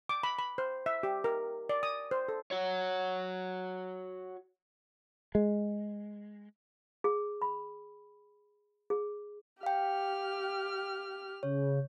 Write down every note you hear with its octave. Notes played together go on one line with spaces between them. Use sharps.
D6
B5
B5
C5
E5
G4
A#4
D5
D#6
C5
A4
F#4 C#5
G#3
G#4
B5
G#4
G4 F5 G5 F6
C#3 C#5